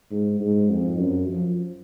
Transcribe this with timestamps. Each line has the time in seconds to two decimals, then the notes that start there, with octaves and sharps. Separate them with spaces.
0.11 G#2
0.40 G#2
0.70 F2
0.99 F#2
1.28 F3